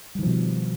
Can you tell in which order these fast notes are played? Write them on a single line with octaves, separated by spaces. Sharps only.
G3 D#3 F3 B2